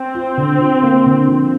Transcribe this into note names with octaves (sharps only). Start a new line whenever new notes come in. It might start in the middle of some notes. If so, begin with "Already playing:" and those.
Already playing: C4
F4
D3
F4
A#3
D3
F3